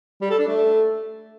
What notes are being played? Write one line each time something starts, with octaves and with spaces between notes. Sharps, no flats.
G3
A4
D4
A3